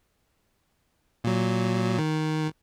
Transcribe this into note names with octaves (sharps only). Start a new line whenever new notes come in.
A#2 F#3
D#3